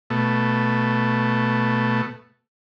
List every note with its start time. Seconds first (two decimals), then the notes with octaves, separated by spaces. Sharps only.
0.10 B2 A3